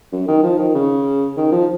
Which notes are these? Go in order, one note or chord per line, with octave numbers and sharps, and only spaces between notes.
F#2
D#3
F3
D#3
C#3
D#3
F3